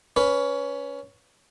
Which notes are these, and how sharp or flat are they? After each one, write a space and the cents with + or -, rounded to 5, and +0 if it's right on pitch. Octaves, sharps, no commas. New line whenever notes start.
C#4 +15 B4 +0